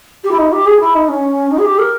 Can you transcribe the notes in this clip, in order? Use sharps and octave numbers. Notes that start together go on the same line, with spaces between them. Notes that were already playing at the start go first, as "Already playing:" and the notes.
G4
E4
D#4
G4
G#4
E4
D#4
C#4
D#4
G#4
G4
A#4